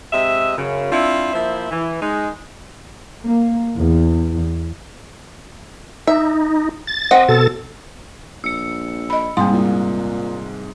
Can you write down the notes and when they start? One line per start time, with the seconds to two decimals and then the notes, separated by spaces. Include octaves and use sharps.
0.13 C3 G#3 D#5 E5
0.58 F#2 C#3
0.92 C4 D4 E4 F4
1.34 F3 A#3 E4 C5 E5
1.71 E3
2.01 G#3 D#4
3.26 A#3
3.77 E2
6.07 D#4 E5
6.87 A6
7.11 C4 D#5 F#5
7.29 B2 A4 A6
8.44 A#1 E6 C#7
9.10 D#5 B5
9.37 G#2 C3 G3 G#3 A#3 C6
9.53 A#2